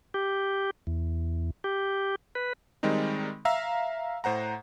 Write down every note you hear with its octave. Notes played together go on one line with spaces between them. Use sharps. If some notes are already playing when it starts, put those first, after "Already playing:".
G4
E2
G4
B4
D#3 G3 G#3 C4 D#4
E5 F5 A#5 E6
A2 C5 F#5 A#5